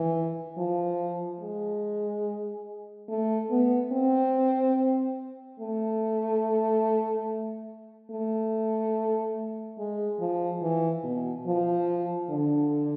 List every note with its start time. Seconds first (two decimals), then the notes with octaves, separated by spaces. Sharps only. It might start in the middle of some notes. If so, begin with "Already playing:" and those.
Already playing: E3
0.57 F3
1.41 G#3
3.09 A3
3.51 B3
3.92 C4
5.60 A3
8.11 A3
9.78 G#3
10.20 F3
10.62 E3
11.04 B2
11.46 F3
12.30 D3